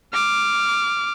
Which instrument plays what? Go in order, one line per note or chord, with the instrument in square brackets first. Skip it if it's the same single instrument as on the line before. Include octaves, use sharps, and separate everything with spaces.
[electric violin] D6 F6